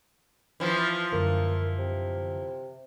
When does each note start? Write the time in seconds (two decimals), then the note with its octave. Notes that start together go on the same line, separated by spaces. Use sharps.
0.60 E3 F3
1.12 F#2 D3 A#3
1.78 C3